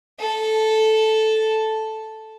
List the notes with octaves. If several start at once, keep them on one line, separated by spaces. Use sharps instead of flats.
A4